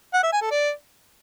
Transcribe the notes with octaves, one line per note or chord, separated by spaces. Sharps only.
F#5
E5
G#5
A4
D5